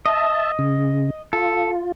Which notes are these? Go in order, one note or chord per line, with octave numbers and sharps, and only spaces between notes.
D#5 E5 A5
C#3
F4 A4